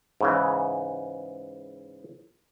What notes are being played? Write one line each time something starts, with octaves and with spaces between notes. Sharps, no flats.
G#2 C#3 E3